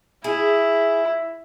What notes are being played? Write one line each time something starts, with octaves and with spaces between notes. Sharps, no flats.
E4 G#4 E5